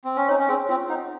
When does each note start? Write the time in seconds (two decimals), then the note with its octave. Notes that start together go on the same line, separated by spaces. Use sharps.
0.05 C4
0.16 C#4
0.29 D#4 C#5
0.40 C#4
0.49 C4 G#4
0.69 C4 F4
0.89 D#4 F#5